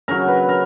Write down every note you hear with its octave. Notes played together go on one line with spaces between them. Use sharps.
C#3 F#3 A#4
B4
A#4